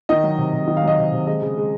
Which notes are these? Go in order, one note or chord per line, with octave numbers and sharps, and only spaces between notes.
D#3 D#5
F#3
C3
C3
D#3
F5
F#3 D#5
C3
C3
G#3 D#5
C#3
G#3